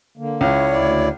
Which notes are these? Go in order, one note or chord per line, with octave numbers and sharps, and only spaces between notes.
D3 A#3
C#2 E4 C#5
D2 E4 D5